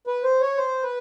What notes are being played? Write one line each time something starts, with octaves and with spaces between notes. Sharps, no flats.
B4
C5
C#5
C5
B4